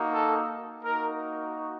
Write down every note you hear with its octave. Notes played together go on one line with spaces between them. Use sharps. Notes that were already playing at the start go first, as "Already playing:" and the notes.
Already playing: A#3 D#4 F#4
A4
A#3 D#4 F#4 A#4